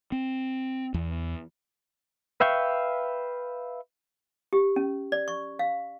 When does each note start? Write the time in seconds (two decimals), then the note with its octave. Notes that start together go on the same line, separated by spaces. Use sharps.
0.12 C4
0.94 E2
2.40 B4 E5 F5 G5 C#6
4.53 G4
4.76 C#4
5.12 D5
5.28 C#6
5.59 F5